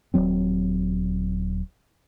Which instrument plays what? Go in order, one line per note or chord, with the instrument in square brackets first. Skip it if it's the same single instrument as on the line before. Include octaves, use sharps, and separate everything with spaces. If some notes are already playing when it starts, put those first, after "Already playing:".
[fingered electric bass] D#1 E2 F#3 C4